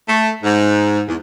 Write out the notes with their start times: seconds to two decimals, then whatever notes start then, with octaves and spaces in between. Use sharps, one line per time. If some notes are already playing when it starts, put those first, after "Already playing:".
0.09 A3
0.44 G#2
1.08 E2